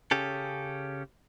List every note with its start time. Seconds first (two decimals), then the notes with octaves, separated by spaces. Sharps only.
0.11 C#3 C#4 G4 A4